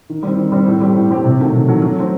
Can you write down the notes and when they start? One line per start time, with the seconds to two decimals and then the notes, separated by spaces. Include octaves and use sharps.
0.10 D#3
0.23 G3 C4
0.38 D#3
0.52 G3 C4
0.66 A2
0.82 G3 C4 G4
0.96 A2
1.11 G3 C4 G4
1.24 C3
1.39 D#3 F#3 A3
1.54 C3
1.69 D#3 F#3 A3
1.82 F#3
1.98 A3 C4